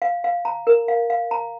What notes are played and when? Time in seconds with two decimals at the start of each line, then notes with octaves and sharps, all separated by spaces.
0.02 F5
0.24 F5
0.45 A#5
0.67 A#4
0.88 F5
1.10 F5
1.31 A#5